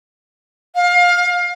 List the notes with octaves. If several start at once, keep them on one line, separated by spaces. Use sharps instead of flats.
F5